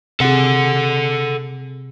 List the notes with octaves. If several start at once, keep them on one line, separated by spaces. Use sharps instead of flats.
C3 G#4 A4 F#5